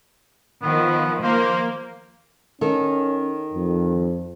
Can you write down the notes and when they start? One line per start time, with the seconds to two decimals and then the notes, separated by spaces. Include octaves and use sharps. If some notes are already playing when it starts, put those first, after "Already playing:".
0.62 D#3 F3 B3
1.22 F3 A#3 C5
2.61 D#3 C#4 A4
3.54 F2